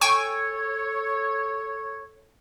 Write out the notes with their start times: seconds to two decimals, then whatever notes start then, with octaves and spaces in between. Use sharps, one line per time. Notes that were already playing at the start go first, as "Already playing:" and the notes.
0.01 A4 C#5 G5 G#5 C#6